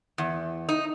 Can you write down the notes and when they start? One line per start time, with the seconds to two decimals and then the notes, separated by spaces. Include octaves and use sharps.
0.18 E2
0.69 D#4